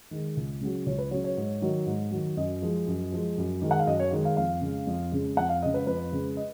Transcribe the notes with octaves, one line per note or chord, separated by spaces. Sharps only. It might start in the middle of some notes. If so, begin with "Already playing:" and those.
D#3 G#3
C#2
C#3 F#3
C#2 C#5
B4
C#3 F#3 C#5
C#5
G#2
D#3 F#3
G#2
D#3 F#3
F#2 D#5
F3 G#3
F#2
F3 G#3
F#2
D#3 G#3
F#5
F5
F#2 D#5
C#5
D#3 G#3
F5
F2 F5
C#3 G#3
F2
C#3 G#3
F2 F#5
F5
C#3 G#3 D#5
B4
F2 B4
C#3 G#3
D#5